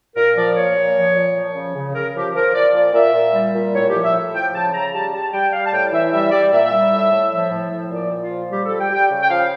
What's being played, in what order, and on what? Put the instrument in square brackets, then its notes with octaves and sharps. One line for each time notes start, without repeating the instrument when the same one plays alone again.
[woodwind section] A#2 A#4
F3 D5
A#2 C#5
A#2
F3
A#2
F3
C#3
C#3
C#3 A#4
F3 G4
F3 A#4
F3 D5
A#2 D5
A#2 E5
A#2
G3
A#2
A2 C#5
G4
F3
E5
A2
F3 G5
C#3 A5
C#3 A#5
G3 A5
G3 A5
G3 G5
G3 F5
A5
A2 G5
E3 E5
G3 E5
G3 D5
A#2 E5
G3
A2
A2
F3
A2
F3
A#2 D5
A#2
F4
F3
G3 G4
G3 A4
G5
G3
G5
C#3
G5
F3 F5